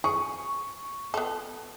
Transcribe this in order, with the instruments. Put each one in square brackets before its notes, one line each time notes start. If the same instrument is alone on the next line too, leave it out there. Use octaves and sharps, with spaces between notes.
[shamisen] G#4 [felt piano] C#6
[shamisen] B3 F4 A4